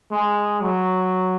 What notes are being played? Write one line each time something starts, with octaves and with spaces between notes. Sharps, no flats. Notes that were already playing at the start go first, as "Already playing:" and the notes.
G#3
F#3